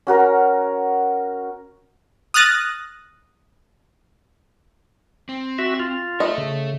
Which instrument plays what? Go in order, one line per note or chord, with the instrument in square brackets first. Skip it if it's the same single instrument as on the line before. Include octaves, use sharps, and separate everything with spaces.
[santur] C#4 F#4 A#4 A#5
[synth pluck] D#6 F6 F#6 A6 A#6
[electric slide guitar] C4
[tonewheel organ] F#4 E5
F4
[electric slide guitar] A4 E5 [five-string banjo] D#5
[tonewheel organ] C#3